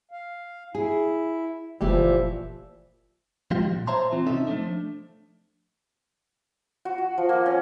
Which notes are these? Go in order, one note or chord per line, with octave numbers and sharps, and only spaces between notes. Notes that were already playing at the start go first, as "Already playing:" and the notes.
F5
E4 G#4
F#1 A#2 E3 F3 A3 G4 E5
F3 F#3 G#3 F4 G4
A#2
C5 C#5 E5 A5 A#5 C6
E3 C4 F4
C3 C#4 D#4 A4 E5
F3 A3 A#3 C#4 D4
F#4
F#4
F3
A#3
C#4